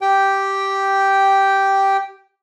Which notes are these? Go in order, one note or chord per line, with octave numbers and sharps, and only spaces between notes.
G4 G5